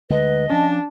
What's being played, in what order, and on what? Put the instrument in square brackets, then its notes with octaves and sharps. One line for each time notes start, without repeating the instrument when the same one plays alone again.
[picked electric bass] D2 D3 G#3 [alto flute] B4 [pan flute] D#5
[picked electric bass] F3 C#4 [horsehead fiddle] D4 [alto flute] A5